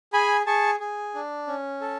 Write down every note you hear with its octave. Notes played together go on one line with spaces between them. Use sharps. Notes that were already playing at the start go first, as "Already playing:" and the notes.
G#4 G#5 B5
G#4 A5 C#6
G#4
D4
C#4
A4